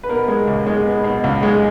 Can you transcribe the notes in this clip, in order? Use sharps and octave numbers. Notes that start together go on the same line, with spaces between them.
B4
B2 A#4
G#3
C#2
G#3
B3
B2
C#2
G#3